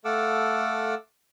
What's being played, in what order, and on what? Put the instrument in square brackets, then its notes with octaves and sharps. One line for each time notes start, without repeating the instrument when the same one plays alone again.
[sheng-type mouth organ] A3 A4 F5 F#5 D6 E6